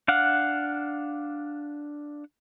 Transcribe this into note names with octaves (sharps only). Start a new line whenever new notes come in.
D4 F5 F#5